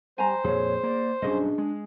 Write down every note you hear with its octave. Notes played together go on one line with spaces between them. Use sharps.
G3 C5 G#5 A#5
F2 A#2 G#4 C#5
A#3 D5
B1 G2 C#4 D4 G#4 D#5
G#3